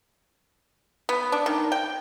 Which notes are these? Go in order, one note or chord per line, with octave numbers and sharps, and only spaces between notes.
B3
D4
D#3
G5